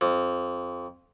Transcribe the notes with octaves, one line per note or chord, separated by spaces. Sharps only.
F2